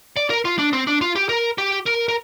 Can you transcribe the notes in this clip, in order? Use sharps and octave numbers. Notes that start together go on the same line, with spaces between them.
D5
A#4
F4
D4
C4
D4
F4
G4
A#4
G4
A#4
A#4